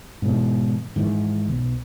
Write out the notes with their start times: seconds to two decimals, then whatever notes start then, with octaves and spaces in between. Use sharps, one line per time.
0.22 G#2 B2 E3
0.96 G#2 D#3 E3
1.48 B1